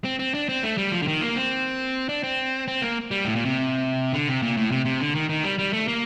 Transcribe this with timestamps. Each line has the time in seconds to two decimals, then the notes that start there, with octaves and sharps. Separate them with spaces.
0.05 C4
0.19 C4
0.34 D4
0.49 C4
0.63 A3
0.78 G3
0.92 F3
1.02 D3
1.07 D#3
1.21 A#3
1.36 C4
2.09 D4
2.24 C4
2.68 C4
2.82 A#3
3.11 G3
3.25 A2
3.36 A#2
3.45 C3
4.13 D3
4.28 C3
4.42 A#2
4.57 A2
4.71 C3
4.85 C3
5.00 D3
5.15 D#3
5.29 D#3
5.44 G3
5.59 G3
5.73 A3
5.88 A#3